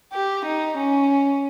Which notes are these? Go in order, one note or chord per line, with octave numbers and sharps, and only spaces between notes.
G4
D#4
C#4